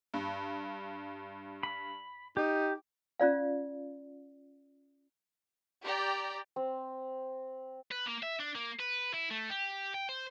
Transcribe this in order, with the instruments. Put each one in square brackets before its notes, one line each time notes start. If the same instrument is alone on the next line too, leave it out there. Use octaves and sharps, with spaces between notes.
[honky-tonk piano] G2
[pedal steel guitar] B5
[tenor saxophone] D#4 [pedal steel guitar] G4
[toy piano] C#4 F4 D5 F5
[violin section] G4 D5 G5 A#5
[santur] C4
[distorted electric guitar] B4
A#3
E5
D4
A#3
B4
E4
A3
G4
G5
C5